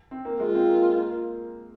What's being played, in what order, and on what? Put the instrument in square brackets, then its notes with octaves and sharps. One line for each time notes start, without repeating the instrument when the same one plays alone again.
[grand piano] C4
A#3
[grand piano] G#3 [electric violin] F4
[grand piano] C4
A#3
A#3